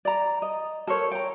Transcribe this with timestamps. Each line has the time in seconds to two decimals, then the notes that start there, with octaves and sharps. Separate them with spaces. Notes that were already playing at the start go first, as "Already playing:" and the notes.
0.05 D5 A#5
0.42 D#5
0.87 A4 A#4 C5 C#5
1.11 G5 A#5